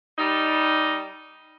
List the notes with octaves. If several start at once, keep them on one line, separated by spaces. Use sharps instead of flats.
G3 D#4